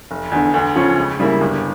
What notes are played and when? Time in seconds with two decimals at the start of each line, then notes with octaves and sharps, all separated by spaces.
0.11 F1
0.32 E2 D3
0.54 D2
0.76 C#3 F3 C#4
0.98 C#2
1.19 C#3 G3 A#3 E4
1.41 G1